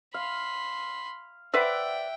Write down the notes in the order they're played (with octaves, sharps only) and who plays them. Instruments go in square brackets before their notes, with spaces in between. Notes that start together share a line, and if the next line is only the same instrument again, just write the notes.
[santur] F5 [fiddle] B5 C6
[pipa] B4 C5 D5 [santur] E5 F#5 [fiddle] G5